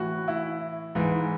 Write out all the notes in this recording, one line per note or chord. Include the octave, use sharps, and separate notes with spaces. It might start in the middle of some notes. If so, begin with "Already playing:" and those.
Already playing: A2 E3 F#4
E4
G#2 E3